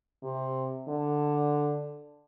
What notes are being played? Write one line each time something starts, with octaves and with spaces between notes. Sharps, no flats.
C3
D3